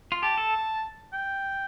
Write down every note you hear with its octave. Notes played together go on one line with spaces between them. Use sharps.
F4
G4 A5
A4
G5